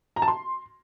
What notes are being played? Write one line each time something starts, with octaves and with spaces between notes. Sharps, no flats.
A#5
A5
C6